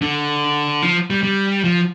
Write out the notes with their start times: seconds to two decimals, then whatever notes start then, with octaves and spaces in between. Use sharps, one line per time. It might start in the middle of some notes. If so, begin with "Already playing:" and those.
0.02 D3
0.82 F3
1.10 G3
1.23 G3
1.64 F3